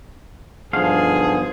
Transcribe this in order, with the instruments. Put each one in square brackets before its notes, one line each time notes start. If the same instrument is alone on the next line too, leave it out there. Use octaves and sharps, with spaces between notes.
[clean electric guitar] B1 D3 F5 [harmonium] G2 F3 [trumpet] G#4